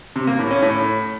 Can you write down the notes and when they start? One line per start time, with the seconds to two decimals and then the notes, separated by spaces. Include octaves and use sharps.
0.16 C3
0.27 A#3
0.39 A2
0.51 C#4
0.62 A2